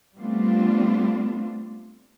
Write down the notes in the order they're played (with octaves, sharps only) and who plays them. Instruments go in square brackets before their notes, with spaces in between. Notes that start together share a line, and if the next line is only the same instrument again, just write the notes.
[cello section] G3 A3 B3 C4 D4 F4